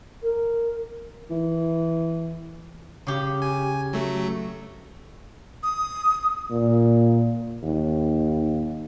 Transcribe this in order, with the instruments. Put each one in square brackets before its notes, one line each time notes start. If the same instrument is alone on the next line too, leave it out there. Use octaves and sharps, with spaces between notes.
[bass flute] A#4
[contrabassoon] E3
[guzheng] C#3 G4
[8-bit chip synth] G#5
F#3 A3
[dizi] D#6
[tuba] A#2
D#2